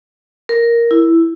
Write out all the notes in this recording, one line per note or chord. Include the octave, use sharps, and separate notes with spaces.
A#4
E4